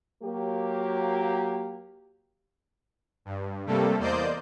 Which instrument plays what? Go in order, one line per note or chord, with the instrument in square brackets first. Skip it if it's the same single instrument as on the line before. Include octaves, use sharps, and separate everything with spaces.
[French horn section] F#3 A#3 G4
[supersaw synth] G2
C3 G3 A3 A#3 A4
E2 A#3 C5 D5 D#5 G6